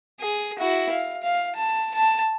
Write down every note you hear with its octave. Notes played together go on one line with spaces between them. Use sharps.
G#4
E4 F#4
F5
F5
A5
A5